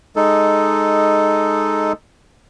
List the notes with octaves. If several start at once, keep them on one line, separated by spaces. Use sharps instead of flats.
G#3 D#4 A4